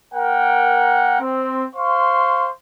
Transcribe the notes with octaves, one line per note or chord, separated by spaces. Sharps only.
A#3 A#4 F#5 G5
C4
C5 F5 C6 C#6